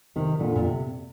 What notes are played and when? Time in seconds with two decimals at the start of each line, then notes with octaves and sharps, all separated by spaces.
0.16 C3 D#3
0.40 A#2 D3
0.56 A#2
0.65 C3